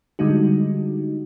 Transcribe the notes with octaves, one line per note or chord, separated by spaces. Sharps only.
D3 G3 G#3 D#4 F#4